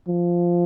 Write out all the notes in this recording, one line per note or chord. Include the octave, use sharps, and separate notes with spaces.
F3